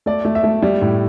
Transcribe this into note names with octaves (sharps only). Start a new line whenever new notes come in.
A3 D5
A3
E5
A3
G3
A2